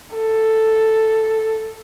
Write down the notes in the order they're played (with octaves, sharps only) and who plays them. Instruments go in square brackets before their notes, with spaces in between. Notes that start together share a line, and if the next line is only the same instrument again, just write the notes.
[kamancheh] A4